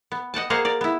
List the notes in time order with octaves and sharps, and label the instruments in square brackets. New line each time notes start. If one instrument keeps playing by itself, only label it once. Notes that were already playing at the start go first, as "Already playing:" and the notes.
[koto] B3
D#5 F#5 G5 A5
A#3 G#4 C5 D#5 F5 F#5
A#4 D5
B3 E4